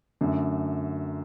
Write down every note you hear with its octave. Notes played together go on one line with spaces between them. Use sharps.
F#2 D3 A3